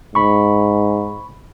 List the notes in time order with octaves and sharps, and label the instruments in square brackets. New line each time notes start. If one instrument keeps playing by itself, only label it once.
[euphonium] G#2 [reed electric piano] B5 C#6